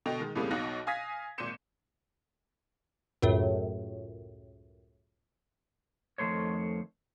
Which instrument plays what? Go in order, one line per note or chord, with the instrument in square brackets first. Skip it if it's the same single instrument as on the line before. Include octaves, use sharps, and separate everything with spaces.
[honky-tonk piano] B2 D3 D#5 G5 F7
D#3 G#3
F2 A2 C#3 G3 A#3 B3
B1 B2 D#4 F5 F#6 A#6
F5 G#5 D#6 G#6 A#6 B6
G#1 A#2 C6 G6 C#7 E7
[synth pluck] C#2 F#2 A2
[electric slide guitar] F2 D#3 E3 A3 C5 C#5